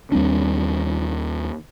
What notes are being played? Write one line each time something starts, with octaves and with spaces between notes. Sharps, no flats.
D#2 G3 C4 D4